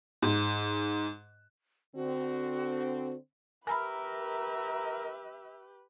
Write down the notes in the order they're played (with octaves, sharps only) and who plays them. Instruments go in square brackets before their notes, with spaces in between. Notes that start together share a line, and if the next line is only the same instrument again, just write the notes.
[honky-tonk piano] G#2
[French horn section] D3 C4 [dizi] F#4
[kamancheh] G4 B4 [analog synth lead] A#4 [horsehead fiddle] E5 [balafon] G#5 A#5 B5